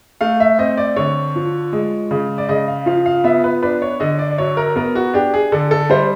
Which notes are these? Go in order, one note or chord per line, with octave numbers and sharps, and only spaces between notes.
A3 F5
E5
C4 D#5
D5
D3 C#5
F3
G#3
C#3
D5
C#3 D#5
F5
F3 F5
F5
B3 E5
B4
D4 B4
C#5
D3 D#5
D5
D5
F#3 C#5
A#4
B3 A#4
F#4
D4 G4
G#4
D3 A4
A4
G3 C5